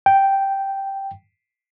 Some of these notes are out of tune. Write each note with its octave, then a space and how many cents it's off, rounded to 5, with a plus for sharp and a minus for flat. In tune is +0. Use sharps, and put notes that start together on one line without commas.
G5 -5